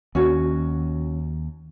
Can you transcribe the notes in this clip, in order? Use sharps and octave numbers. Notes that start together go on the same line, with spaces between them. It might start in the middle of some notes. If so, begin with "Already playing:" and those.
D#2 C#4 F#4